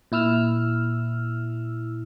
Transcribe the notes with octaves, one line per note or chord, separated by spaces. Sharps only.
A#2 E4 E6 F6